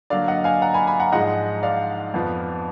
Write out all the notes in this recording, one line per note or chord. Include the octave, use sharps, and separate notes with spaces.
D3 F#3 A#3 D5 F5
D#5 F#5
F5 G#5
F#5 A#5
G#5 B5
G#5 B5
F#5 A#5
G#2 F3 G#3 D#5 F#5
D5 F5
F2 F3 B3